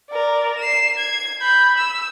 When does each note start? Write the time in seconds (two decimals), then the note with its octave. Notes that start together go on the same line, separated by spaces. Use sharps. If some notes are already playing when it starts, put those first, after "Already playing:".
0.11 A#4 D5
0.58 C7 E7
0.98 G#6
1.41 B5 G6
1.77 E6